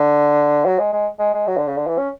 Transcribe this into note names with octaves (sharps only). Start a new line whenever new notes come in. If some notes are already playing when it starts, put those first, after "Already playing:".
Already playing: D3
F#3
G#3
G#3
G#3
G#3
F#3
D3
C#3
D3
E3
C#4